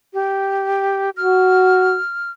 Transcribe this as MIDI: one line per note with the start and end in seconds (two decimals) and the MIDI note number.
0.14 1.10 67
1.17 1.97 66
1.17 2.31 89